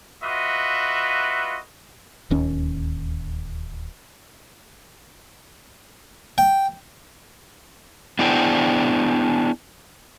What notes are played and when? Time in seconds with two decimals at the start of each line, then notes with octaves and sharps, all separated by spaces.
0.23 F4 F#4 B4 D#5 E5
2.30 D1 D#2 C#4
6.38 G5
8.19 B3 D4 E4 G#4 C5 G5